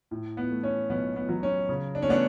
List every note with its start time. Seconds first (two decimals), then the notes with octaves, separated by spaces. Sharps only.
0.11 A2
0.37 B3
0.51 A3
0.63 C#4
0.89 B1 B3
1.16 B3
1.29 F#3
1.43 C#4
1.69 C#3
1.95 D4
2.02 C#4
2.08 A3 B3 D4